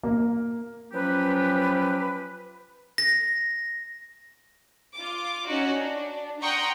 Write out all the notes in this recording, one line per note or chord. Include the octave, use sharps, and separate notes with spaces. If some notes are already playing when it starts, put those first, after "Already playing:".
A#3
F3 F#3 C#4 G4 B4
A#6
F4 D6
C#4 D#4 F#4
D4
F#5 G5 A#5 C6 C#6 D#6